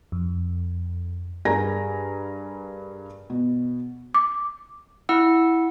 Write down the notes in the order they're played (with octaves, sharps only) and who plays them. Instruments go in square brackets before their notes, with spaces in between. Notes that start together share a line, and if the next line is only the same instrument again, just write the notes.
[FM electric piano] F2
[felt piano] G2 G#4 A#4 G#5 A#5 A#6
B2
[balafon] D6
[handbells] E4 F#5 E6